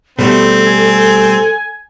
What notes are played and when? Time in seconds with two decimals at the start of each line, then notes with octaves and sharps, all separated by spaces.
0.19 B2 G3 A3 C4 A4
0.66 G#5